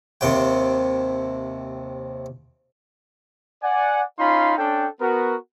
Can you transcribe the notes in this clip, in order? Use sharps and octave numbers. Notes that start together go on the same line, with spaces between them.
D#2 C3 G5
D5 F#5 G#5
C#4 D#4 F4 F5 B5 C6
C#4 D4 A4 G5
B3 F#4 A#4